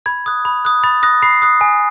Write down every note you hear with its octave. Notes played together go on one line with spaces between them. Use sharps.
B5 G#6
D#6 F#6
B5
D#6 F#6
B5 A6
D#6 F#6 A#6
B5 C7
D#6 F#6
G#5